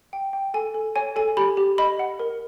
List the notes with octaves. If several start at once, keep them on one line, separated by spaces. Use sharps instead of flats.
G5
G5
A4 G#5
A4
C#5 G#5
A4 G#5
G4 B5
G4
D#5 B5
F#5
A#4